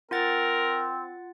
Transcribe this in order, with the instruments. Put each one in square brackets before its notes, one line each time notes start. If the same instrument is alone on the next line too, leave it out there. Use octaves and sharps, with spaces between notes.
[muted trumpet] C4 [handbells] F4 F#5 A6 [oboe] A#4